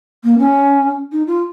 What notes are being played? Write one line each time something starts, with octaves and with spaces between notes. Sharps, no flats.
A#3
C#4
D#4
F4